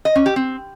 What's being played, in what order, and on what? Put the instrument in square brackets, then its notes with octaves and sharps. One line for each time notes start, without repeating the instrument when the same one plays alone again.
[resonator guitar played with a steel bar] D#5
C#4
G4
C4